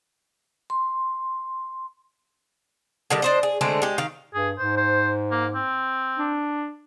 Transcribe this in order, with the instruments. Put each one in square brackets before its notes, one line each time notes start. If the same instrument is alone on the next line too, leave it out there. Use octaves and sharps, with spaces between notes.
[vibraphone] C6
[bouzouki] D3 D#3 G3
D4 C5 D#5
G#4
D3 G#3 A3 C4
G#3 G4
D#3 F5
[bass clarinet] G2 [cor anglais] G#4
[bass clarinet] G#2 [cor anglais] C5
[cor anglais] C5
A#3
C4
[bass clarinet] D4